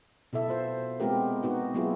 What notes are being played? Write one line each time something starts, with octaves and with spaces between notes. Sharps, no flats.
B2 E4 A4 E5
B3 F4 C5
G#3 B3 C4 F4 G4 A#4
B3 D#4 F#4
F#3 A#3 B3 E4 F4 G#4